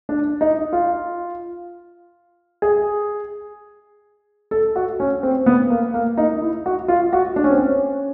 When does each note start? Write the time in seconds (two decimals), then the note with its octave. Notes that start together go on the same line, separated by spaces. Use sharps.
0.09 D4
0.41 D#4
0.73 F4
2.62 G#4
4.51 A4
4.76 F#4
5.00 C#4
5.23 C4
5.46 B3
5.70 A#3
5.94 A#3
6.18 D#4
6.41 E4
6.66 F#4
6.88 F4
7.13 F#4
7.36 D4
7.44 C#4
7.51 C4
7.57 C#4